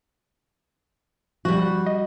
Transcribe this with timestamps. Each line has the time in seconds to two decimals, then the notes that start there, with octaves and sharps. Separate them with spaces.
1.45 F3 G3 F#4
1.86 D#5